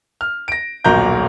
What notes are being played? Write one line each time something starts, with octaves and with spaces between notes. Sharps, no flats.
F6
A#6 D7
D#1 B1 A#2 F#4 A#5 G6